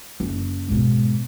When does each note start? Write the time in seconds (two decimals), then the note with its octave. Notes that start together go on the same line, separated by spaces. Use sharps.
0.20 F#1
0.68 G#2 B2